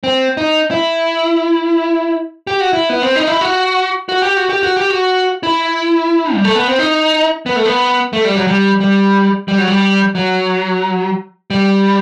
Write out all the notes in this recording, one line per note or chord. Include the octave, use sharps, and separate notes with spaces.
C4
D#4
E4
G4
F#4
E4
B3
C4
D#4
E4
F#4
F#4
G4
F#4
G4
F#4
G4
F#4
E4
G3
A3
B3
C4
D#4
B3
A3
B3
A3
G3
F#3
G3
G3
G3
F#3
G3
F#3
G3